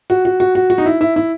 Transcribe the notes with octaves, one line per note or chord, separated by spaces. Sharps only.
F#4
F#4
F#4
F#4
F#4
D#4
E4
E4
E4